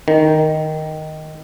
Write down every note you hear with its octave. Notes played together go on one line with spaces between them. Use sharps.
D#3